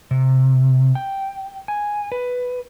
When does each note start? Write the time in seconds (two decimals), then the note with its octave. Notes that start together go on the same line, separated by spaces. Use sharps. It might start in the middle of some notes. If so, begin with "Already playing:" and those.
0.11 C3
0.95 G5
1.68 G#5
2.12 B4